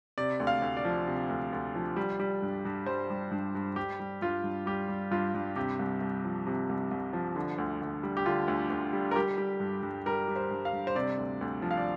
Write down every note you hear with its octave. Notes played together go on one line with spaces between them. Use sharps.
C3 D5
D2
F5
D2
D5
F3
C3
D2
D2
F3
G3
G3
G2
G2
G3 C5
G3
G2
G2
G3 G4
G3
G2 F4
G2
G3 G4
G3
G2 F4
G2
C3 G4
C2
C2
F3
C3
C2
C2
F3
D3
D2
D2
G3
G4
D3 F4
D2
D2
G3
A#4
G3 G4
G3
G2
G2
G3 A#4
G3
C5
G2
F5
G2
C5
C3 D5
D2
D2
F3
F5
D5